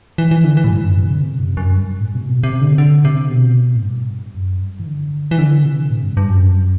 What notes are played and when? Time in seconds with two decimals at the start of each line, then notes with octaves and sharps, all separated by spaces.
0.18 E3
0.31 E3
0.44 D3
0.57 E3
0.64 A2
0.70 G2
0.83 F#2
0.96 G2
1.03 C3
1.10 D3
1.22 C3
1.40 F#2
1.57 F#2
1.74 G2
2.00 A2
2.15 C3
2.26 B2
2.44 C3
2.61 D3
2.78 D3
3.05 C3
3.30 B2
3.76 A2
3.83 G2
4.35 F#2
4.61 G2
4.80 E3
4.87 D3
5.31 E3
5.39 D3
5.65 C3
5.90 A2
6.04 G2
6.17 G2
6.30 F#2